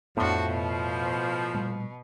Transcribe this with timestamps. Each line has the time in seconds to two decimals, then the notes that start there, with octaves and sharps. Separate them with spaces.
0.17 F2 A2 F3 B3 D4 F#4
0.47 B2
1.54 A#2 G3 A3